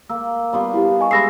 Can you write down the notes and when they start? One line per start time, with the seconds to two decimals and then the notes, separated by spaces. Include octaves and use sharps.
0.10 A#3 E6
0.53 G3 B3 F4
0.73 E4 G4 A5
0.99 D#5 G#5 C#6
1.11 G#3 B4 E5 B5 A#6 C7